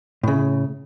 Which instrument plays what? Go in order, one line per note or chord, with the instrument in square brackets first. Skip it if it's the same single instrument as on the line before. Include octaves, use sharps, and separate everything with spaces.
[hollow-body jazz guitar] A2 C#3